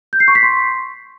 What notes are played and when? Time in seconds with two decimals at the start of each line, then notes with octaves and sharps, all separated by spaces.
0.13 G6
0.20 C7
0.28 C#6
0.35 B6
0.43 C6